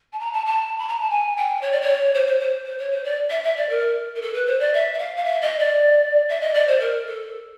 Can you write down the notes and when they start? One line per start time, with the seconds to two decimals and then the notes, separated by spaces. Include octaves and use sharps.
0.12 A5
0.19 A#5
0.32 A5
0.45 A5
0.78 B5
0.88 A#5
0.99 A5
1.09 G#5
1.36 G5
1.61 C#5
1.71 D5
1.81 C#5
2.14 C5
2.26 C5
2.39 C5
2.65 C5
2.78 C#5
2.91 C5
3.04 D5
3.29 E5
3.43 E5
3.56 D5
3.69 A#4
4.15 A#4
4.21 A4
4.33 B4
4.46 C5
4.59 D5
4.73 E5
4.93 E5
4.98 F5
5.16 F5
5.24 E5
5.41 D#5
5.58 D5
6.28 E5
6.41 D#5
6.53 D5
6.67 C5
6.79 A#4
7.06 A4